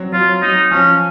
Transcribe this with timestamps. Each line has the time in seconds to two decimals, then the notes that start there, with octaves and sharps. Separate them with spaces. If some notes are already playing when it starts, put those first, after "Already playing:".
Already playing: F#3 C4
0.12 F#3 F4
0.42 F#3 D#4
0.71 F3 C#4